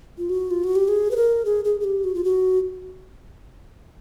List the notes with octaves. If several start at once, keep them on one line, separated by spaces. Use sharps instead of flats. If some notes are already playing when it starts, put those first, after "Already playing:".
F4
F#4
F4
F#4
G4
G#4
B4
A#4
G#4
G#4
G#4
G4
F#4
F4
F#4